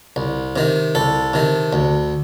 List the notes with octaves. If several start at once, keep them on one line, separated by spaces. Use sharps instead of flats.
C2
C3 D#3
C2 A4
C3 D#3
D2